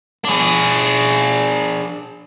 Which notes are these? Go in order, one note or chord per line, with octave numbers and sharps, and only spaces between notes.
D4 G#4